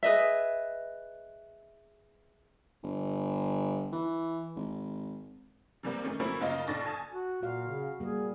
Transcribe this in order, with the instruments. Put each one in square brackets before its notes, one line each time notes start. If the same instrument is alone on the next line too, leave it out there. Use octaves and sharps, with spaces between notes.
[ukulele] G#4 B4 D#5 E5
[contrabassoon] G1
E3
G#1
[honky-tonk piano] C3 E3 G3 A#3
D#3 A3 C#4
F3 F#3 A3 A#3 C#4 E4
F#2 C#3 A#3 F4 D#5
A#1 D4 A4 C#6 A6 A#6
G#5 A5 D#6
[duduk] F#4
[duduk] A#2 [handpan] F#4 F5
[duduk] C#3
[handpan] G3 A#3 [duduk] G#4